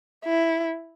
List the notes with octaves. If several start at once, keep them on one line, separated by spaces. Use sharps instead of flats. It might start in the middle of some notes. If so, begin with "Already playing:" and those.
E4